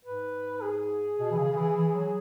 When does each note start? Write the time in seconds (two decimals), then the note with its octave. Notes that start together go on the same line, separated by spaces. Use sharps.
0.05 G#2 B4
0.62 G#4
1.19 B2
1.31 E3
1.39 C#3
1.52 C#3
1.57 E3
1.77 E3
1.95 F#3